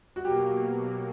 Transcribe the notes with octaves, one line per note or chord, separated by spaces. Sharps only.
F#4
B2 F#3 A#3 G4